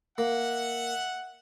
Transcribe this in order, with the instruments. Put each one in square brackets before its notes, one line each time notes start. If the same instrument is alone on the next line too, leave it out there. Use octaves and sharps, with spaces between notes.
[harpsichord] A#3 [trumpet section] E5 F#5